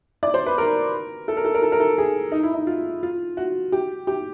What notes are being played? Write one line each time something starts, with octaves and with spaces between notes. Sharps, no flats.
D5
C5
B4
A#4
A4
A#4
A4
A#4
A4
A#4
A4
G#4
D#4
E4
D#4
F4
F4
F#4
G4
G4